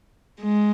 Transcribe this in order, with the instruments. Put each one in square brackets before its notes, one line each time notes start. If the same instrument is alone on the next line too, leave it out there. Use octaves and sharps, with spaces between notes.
[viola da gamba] G#3